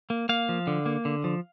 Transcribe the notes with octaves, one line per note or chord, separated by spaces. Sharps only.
A#3
A#3 F5
F3
D3
A#3
D3
F3